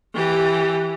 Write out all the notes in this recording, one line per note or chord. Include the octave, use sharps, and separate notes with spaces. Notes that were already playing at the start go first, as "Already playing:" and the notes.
E3 G4